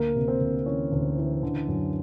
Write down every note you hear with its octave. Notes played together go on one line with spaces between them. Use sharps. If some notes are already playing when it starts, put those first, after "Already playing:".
Already playing: D2 A#3 A#4
C3
C4 C5
D2
E3 C#4 C#5
D2
E3
D3
F#2